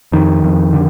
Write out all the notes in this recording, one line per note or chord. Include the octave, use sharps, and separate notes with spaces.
F2 D#3
F2
D3